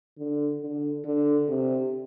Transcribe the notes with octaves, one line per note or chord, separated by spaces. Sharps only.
D3
D3
D3
C3